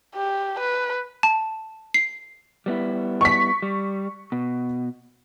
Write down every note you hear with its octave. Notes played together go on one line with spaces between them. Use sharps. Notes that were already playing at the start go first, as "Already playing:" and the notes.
G4
B4
A5
C7
G3 B3 E4
C#6 B6
G3
B2